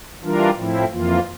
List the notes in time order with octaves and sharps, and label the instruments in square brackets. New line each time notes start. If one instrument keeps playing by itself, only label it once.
[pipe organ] E3 G3 D4 F4 A#4
A2 F3 C4 E4
F2 E3 A#3 F4